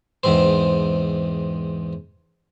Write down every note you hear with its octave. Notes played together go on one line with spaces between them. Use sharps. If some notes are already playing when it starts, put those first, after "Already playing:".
E2 G#2 C4 C5